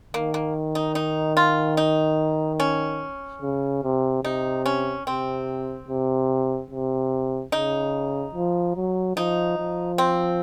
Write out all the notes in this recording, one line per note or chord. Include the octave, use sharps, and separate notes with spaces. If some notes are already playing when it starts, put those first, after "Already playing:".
D#3 A#3
A#3
D#4
D#4
F4
D#4
C#4
C#3
C3
C3 D#4
C#4
C3 C4
C3
C3
C#3 D#4
F3
F#3
F3 D#4
F3
C4